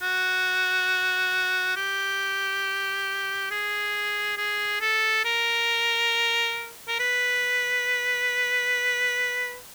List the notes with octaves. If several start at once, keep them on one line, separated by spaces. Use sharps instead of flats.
F#4
G4
G#4
G#4
A4
A#4
A#4
B4